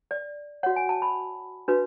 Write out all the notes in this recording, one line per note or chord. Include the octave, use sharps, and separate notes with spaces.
D5
F#4 C#5 F#5
G#5
A5
B5
D4 F#4 B4